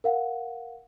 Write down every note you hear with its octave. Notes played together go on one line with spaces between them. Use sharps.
A#4 F5 F#5